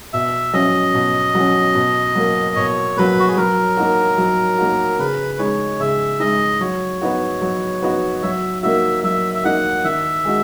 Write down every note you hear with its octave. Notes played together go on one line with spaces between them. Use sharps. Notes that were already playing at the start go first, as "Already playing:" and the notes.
B2 E5
F#3 C#4 D#5
B2
F#3 C#4
B2
F#3 A#3
B2 C#5
F#3 A#3 B4
F#4
G#4
F#3 A#4
A#3 D#4 F#4
F#3
A#3 D#4 F#4
C#3 B4
G#3 D#4 C#5
C#3 E5
G#3 D#4 D#5
F#3 C#5
B3 D#4 F#4
F#3
B3 D#4 F#4
F#3 E5
A#3 D#4 F#4 E5
F#3 E5
E5
A#3 D#4 F#4 F#5
D#3 E5
G#3 D#4 F#4